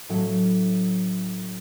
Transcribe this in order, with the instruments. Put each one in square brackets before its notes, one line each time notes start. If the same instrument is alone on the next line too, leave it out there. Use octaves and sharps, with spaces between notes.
[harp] A2 F#3 C#4